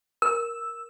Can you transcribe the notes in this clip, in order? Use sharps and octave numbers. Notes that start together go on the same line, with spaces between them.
A#4 E6